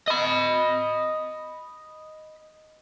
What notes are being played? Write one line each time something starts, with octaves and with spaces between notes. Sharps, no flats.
D#5 B5